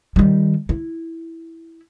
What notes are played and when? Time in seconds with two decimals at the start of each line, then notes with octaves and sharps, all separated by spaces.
0.16 D#3 G3
0.69 E4